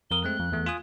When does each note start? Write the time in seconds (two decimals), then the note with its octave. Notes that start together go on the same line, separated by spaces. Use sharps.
0.11 F2 A#4 D#6 G7
0.24 G#3 A3 C4 F#6
0.39 F2
0.52 E2 A3
0.66 F4 G#5 D#6